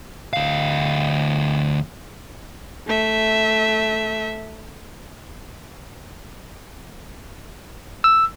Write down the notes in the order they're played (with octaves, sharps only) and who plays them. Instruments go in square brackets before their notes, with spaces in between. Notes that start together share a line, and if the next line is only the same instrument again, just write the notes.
[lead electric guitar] D2 F5
[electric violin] A3 E5
[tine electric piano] E6